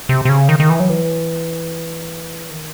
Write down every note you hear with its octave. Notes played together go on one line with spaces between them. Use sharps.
C3
C3
C#3
D#3
D#3
E3
F#3
E3
D#3